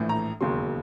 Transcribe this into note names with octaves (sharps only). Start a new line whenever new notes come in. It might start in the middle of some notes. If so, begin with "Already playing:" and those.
Already playing: A#1 A2 E3 A3
A#5
E1 D#2 C#3 F#3 C6